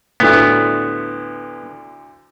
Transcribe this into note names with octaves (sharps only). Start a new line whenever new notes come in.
D2 A2 D3 B3